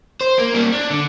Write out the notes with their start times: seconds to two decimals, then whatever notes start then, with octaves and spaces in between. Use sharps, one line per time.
0.21 C5
0.39 A#3
0.54 G3 A#3
0.73 D4
0.90 D3